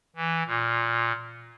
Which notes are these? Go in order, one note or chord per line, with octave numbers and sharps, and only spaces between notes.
E3
A#2